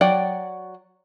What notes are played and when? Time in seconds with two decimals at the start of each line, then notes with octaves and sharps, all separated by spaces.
0.01 F#3 D5 F#5 G5